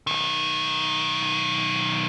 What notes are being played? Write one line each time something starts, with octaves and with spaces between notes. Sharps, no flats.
B1 D#3